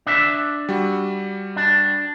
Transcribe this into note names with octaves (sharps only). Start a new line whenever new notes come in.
D4 E5
G3 F#4
D4